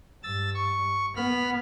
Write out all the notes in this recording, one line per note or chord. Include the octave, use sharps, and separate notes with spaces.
G2 E6 A6
C#6
B3 B5 F6